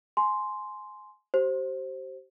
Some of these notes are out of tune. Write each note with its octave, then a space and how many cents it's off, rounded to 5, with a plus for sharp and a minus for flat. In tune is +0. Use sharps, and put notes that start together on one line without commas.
G#5 +20 C6 +0
G4 -40 C5 +10